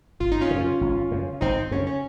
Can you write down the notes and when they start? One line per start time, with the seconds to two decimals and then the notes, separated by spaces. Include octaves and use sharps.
0.20 G#1 F4
0.32 D#4
0.41 C#4 F4
0.51 F#2 C#3
0.81 G#1
1.11 F#2 C#3
1.41 G#1 C4 D#4
1.71 F#2 C#3 C#4
1.87 C#4